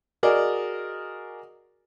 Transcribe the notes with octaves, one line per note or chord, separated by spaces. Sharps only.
F#4 G#4 A#4 D5 D#5